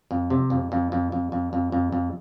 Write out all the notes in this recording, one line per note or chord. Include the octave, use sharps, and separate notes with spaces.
F2
C3
F2
F2
F2
F2
F2
F2
F2
F2